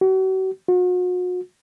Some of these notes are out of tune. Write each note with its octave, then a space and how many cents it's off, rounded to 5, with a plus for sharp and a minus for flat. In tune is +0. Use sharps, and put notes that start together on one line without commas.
F#4 +40
F#4 -40